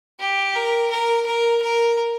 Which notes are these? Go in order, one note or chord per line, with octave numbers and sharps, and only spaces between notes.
G4
A#4
A#4
A#4
A#4